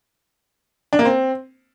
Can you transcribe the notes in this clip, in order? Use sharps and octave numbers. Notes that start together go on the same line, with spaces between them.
D4
A#3
C4